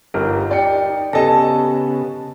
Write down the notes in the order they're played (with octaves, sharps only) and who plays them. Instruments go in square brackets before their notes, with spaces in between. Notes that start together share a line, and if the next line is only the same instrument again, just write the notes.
[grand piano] G1 [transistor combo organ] D#4 G4 [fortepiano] A#4
[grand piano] D5 G5 C#7
[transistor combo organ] C#3 B3 [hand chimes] G4 G#5 [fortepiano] A4 D#5 [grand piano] A5 A#6